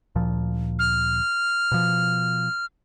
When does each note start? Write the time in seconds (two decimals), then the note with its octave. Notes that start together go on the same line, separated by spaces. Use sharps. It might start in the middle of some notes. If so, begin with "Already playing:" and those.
0.15 D2 A#2 F3
0.79 F6
1.72 B2 F3